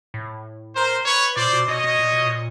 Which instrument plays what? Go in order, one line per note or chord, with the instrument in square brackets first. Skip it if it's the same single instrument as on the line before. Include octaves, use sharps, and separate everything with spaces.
[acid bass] A2
[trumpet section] A#4 C5
B4 C#5
[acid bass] A#2 [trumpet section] C5 D5
[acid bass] B2
[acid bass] B2 [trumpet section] C#5 D#5
[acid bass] B2
A#2
B2
A#2